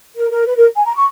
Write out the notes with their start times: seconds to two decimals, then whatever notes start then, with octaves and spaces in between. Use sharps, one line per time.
0.17 A#4
0.32 A#4
0.46 B4
0.56 A#4
0.76 G#5
0.86 A#5
0.96 C#6